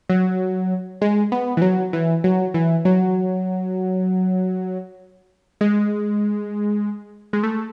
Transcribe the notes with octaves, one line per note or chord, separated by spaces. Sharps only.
F#3
G#3
B3
E3
F#3
E3
F#3
E3
F#3
G#3
G#3
A3